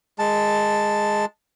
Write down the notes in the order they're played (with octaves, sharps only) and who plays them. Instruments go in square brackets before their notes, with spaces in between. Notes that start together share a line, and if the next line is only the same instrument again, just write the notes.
[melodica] G#3 A5